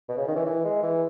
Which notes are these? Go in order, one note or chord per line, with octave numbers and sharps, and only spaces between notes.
B2
C#3
D#3
E3
E3
G#3
E3